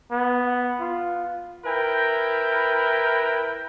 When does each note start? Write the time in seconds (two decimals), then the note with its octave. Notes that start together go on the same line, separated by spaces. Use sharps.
0.12 B3
0.81 F4
1.65 E4 A#4 B4 G5